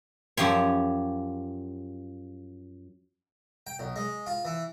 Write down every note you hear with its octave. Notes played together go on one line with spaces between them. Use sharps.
F#2 F3 G4 C#5
G5
B1
G#3
F4
E3